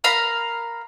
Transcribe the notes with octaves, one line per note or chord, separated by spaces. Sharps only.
A#4 F5 A#5 B5